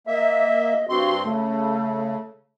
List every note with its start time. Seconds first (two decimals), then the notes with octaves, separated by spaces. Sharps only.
0.07 A#3 D#5 E5
0.89 G2 C4 F#4 C6
1.24 C#3 A3